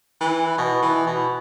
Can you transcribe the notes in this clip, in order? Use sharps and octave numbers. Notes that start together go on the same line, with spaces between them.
E3
B2
E3
B2